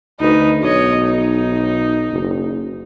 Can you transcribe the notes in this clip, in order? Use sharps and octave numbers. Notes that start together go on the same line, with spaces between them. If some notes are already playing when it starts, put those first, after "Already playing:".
D2 D#4 B4
B1 C#5 D#5
D#4
F#1